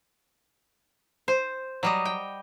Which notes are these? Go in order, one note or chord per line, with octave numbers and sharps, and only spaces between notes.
C5
F#3 G3 D#5
G5